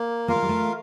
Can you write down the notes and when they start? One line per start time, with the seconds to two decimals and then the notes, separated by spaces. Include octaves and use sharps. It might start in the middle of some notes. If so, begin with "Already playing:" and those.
Already playing: A#3
0.28 A#3 F4 A#4 F5
0.36 A3
0.42 G3
0.49 A3